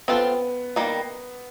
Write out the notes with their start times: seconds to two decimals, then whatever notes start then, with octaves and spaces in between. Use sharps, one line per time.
0.08 B3 C4 F4 A4
0.76 D#3 G3 A#3